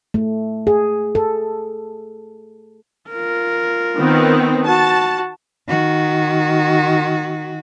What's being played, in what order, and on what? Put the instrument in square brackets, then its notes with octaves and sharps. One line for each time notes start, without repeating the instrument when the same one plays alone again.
[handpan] A3
G#4
A4
[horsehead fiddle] F4 A#4
[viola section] D#3 B3 C4
[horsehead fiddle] F#4 [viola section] A5
[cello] D#3 F#4